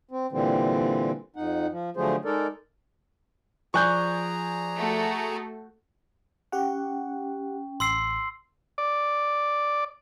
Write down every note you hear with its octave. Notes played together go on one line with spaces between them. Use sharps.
C4
A#2 D3 E3 G3 C4
F2 D#4 F#5
F3
D3 F3 F#3 A3 G#4 C5
G#3 D#4 A4 A#4 D5
F3 G#4 D5 G#5 A#5 C#6 F#6 G6
A3 F#4
C#4 G4 F#5 G5
A1 C6 E6 C7
D5